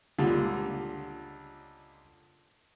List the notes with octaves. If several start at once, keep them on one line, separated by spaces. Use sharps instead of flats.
C#2 A#2 D3 G3